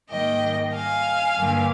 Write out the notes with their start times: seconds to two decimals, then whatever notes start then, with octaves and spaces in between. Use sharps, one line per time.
0.11 G#2 D#3 G3 A#3 D#5 G5
0.74 F5 G#5
1.37 G2 D3 G3 A#3